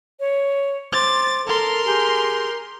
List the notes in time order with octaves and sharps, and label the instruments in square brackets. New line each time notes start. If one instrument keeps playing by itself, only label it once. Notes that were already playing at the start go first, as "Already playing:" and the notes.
[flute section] C#5
[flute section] C5 D6 [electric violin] A6
[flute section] A4 [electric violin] A#4 C6
[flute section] G4 G#4